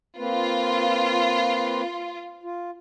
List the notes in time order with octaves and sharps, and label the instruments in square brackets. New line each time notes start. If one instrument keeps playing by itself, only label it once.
[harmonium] A#3 C4 B4 [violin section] F4
[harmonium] F4